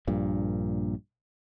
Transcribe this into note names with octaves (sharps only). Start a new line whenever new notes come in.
A#1 G2 A#2